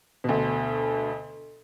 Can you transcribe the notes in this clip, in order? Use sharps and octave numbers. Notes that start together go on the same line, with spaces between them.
D2 B2